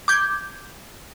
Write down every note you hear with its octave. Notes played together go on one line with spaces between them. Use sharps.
D6 G6 G#6